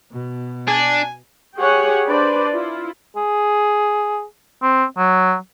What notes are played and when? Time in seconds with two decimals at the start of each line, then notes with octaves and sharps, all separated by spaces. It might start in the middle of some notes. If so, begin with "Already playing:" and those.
0.11 B2
0.68 D4 G#5
1.57 G4 G#4 C#5 F#5 G#5
2.07 D4 B4 C5 D5
2.52 E4 F4
3.17 G#4
4.63 C4
4.97 F#3